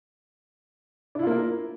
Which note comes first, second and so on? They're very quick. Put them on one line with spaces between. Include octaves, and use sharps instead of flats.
D4 E4 F4 A#3 A#4